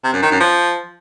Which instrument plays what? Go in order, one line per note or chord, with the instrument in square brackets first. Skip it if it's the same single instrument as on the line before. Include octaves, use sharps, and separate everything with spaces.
[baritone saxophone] C3
F#2
D#3
F#2
F3